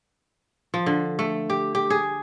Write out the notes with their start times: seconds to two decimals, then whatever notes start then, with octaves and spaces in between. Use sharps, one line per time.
0.74 F3
0.86 D3
1.19 A3
1.50 G4
1.75 G4
1.90 G#4